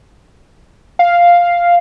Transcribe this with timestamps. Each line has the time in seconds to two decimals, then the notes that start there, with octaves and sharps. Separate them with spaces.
0.99 F5